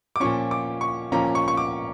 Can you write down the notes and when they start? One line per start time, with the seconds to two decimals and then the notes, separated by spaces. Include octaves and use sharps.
0.16 D6
0.20 A#2 F3 C#4 C#6
0.51 D6
0.81 C#6
1.12 A#2 F3 C#4 A#5
1.35 C#6
1.48 C#6
1.57 D6